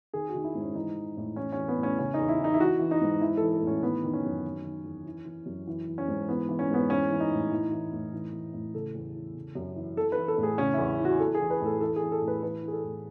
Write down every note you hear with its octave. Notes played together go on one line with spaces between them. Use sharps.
D#3 G#4
F#4
D#3
E4
G#2
C#4
E3 D#4
E3
A2
E3 C#4
C#4
E3
B3
A2 C#4
C#3 C#4
E2 D#4
E4
E3
D#4
E4
E3 F#4
E3
D#4
G#2
E3 E4
E3 A4
A4
A2
C#4
D#3 B3
D#3
C#4
F#2
D#3
D#3
E2
E3
E3
F#2
E3
E3
C#4
G#2
E3 B3
E3
C#4
G#2 B3
E3 C#4
E3
D#4
A2
E3
E3
A2
E3
E3
A2
C#3 A4
E2
E3
C#3
F#2
E3
E3 A4
B4
E3
A4
A2
G#4
C#3 C#4
E2 E4
E3
F#4
E3 A4
G#4
E3
B4
A2 A4
E3 A4
E3 G#4
A4
A2
B4
E3 B4
E3 G#4
A4
A2